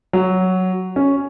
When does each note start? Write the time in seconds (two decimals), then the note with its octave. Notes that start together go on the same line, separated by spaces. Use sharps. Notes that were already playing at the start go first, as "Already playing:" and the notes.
0.13 F#3
0.96 C#4